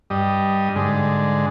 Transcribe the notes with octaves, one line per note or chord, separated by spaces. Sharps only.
G2 G3 D#5
G#2 D3 G#3